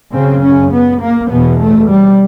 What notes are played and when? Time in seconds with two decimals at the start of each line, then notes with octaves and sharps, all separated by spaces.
0.13 F#2 C#3 C4
0.42 C#4
0.72 B3
1.01 A#3
1.30 E2 B2 B3
1.60 A3
1.89 G3